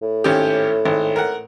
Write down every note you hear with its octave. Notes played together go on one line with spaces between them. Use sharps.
A2
G#1 C#4 G4
G#1
A#4 F#5